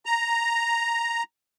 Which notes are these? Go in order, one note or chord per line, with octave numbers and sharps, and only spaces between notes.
A#5